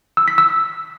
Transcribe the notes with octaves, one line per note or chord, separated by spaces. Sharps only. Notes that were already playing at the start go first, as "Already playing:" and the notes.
E6
B6
E6